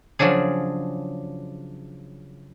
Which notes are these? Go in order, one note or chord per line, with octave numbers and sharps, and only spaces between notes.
C#3 F3 F#3 D4 G#4